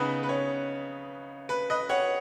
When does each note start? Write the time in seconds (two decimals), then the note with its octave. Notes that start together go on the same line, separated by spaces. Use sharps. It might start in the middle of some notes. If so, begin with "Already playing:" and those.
Already playing: C#3 B3 D#4 B4 D#5
0.23 B4
0.29 C#5
1.49 B4
1.70 B4 D#5
1.89 C#5 F#5